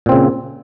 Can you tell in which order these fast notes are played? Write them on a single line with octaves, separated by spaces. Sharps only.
A#2 C4 C#3